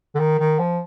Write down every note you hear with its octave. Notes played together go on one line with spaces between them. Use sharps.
D3
D#3
D#3
F3